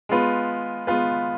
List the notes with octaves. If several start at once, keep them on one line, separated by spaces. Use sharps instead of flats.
G#3 B3 F4 B4
G#3 B3 F4 B4